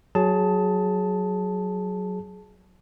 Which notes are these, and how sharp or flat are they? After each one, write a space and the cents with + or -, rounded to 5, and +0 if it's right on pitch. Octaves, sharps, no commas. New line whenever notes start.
F#3 +0 G#4 +20 A5 +0